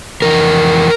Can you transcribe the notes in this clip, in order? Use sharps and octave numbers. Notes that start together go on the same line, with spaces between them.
F2 E3 A#4